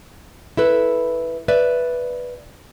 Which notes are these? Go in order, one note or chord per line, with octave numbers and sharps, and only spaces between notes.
E4 A4 B4
B4 D5 E5